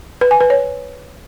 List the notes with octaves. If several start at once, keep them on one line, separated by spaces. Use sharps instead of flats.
B4
G#5
B4
C#5